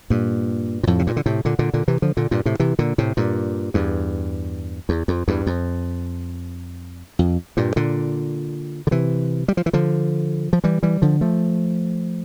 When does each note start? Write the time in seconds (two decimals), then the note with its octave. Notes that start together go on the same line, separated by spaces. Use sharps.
0.10 G2 A#2
0.83 A#2
0.87 F2 A2
0.99 C3
1.07 G2 A#2
1.17 D3
1.26 A2 C3
1.45 A#2 D3
1.59 A#2 D3
1.73 A#2 D3
1.88 C3 E3
2.02 D3 F3
2.17 A#2 D3
2.31 G2 A#2
2.45 A2 C3
2.60 C3 E3
2.79 A#2 D3
2.98 A2 C3
3.17 G2 A#2
3.74 E2 G2
4.89 E2
5.08 F2
5.28 E2 G2
5.47 F2
7.19 F2
7.57 G2 A#2
7.76 A#2 D3
8.87 D3
8.91 C3 E3
9.48 G3
9.57 F3
9.66 E3
9.73 D3 F3
10.53 F3
10.64 E3 G3
10.83 E3 G3
11.02 D3 F3
11.21 F3 A3